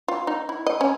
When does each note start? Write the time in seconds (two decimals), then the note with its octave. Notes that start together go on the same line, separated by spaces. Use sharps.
0.08 F4
0.27 D#4
0.49 E4
0.66 D#5
0.81 C#4